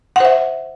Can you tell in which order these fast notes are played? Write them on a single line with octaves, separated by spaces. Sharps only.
F#5 C5 E5